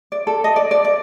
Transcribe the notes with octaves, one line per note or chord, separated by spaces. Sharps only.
D5
A4
D#5
D5
D5
D5